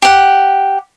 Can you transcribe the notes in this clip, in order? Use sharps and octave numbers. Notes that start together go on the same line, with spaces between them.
G4 F#5